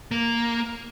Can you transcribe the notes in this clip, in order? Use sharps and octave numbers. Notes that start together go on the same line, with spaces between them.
A#3